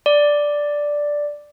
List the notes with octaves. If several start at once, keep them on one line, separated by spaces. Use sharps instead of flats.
D5